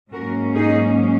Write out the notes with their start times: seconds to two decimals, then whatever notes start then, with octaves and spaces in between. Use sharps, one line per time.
0.12 G#2 F#3 A#3 C#4 F#4 A#4
0.55 D#4 G#4